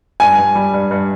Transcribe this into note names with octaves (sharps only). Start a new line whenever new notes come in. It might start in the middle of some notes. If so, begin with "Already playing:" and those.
G2 G#5
G2
G3
G2
G2